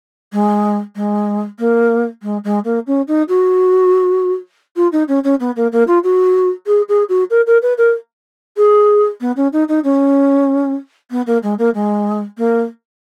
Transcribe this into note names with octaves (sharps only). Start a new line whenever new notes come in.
G#3
G#3
A#3
G#3
G#3
A#3
C#4
D#4
F#4
F4
D#4
C#4
C#4
B3
A#3
A#3
F4
F#4
G#4
G#4
F#4
A#4
A#4
B4
A#4
G#4
B3
C#4
D#4
D#4
C#4
B3
A#3
G#3
A#3
G#3
A#3